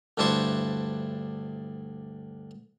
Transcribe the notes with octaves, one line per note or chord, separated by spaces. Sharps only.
D2 G2 D4 E4 C5 C#6